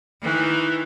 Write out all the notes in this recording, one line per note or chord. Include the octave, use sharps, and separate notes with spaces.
D#3 E3